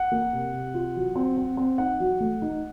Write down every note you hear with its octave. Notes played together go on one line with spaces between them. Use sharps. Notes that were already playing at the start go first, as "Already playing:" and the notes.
Already playing: F#5
A#3
C3
C3
F4
F#3
C4
C4
C4
D#4 F#5
F#3
A3
D#4